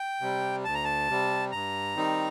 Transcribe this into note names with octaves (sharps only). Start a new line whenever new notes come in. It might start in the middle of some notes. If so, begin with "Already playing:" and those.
Already playing: G5
C3 G3
D2 A5
A#5
A5
C3 G3
G2 A#5
D#3 G3 C4 D#4